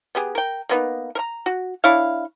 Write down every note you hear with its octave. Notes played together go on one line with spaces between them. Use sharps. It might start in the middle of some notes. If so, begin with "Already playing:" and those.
B3 G4 G#4
A#4 G5
A#3 B3 D#4
A#4 A#5
F#4
D4 E4 C#5 F5